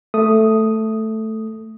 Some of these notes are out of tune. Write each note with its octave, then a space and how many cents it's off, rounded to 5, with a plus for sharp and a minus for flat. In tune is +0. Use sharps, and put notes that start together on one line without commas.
A3 +0 D#6 +0